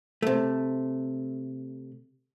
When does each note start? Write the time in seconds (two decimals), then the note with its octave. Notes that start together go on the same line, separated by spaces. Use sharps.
0.22 C3 A3